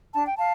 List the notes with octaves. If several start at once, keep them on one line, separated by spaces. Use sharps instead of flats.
D4 A5
G5
F5 A5